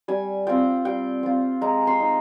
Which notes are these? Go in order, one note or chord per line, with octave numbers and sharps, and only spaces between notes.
G3 G#5
C4 F4 G5
G3 G5
C4 F4
G#3 A#5
C6
D#4